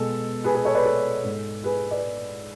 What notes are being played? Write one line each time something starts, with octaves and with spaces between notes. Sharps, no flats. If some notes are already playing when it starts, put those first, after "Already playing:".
Already playing: B2 G#3 A4
G#4 B4
G#4 B4
A4 C#5
B4 D5
A4
G#2 G#3
G#4 B4
B4 D5